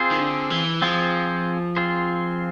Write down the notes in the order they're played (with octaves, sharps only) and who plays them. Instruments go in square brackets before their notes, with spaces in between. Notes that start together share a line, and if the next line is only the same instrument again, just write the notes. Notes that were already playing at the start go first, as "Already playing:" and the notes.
Already playing: [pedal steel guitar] C4 F4 G#4 C5
[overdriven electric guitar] D#3
D3
E3
[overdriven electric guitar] F3 [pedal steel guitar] C4 F4 G#4 C5
[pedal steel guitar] C4 F4 G#4 C5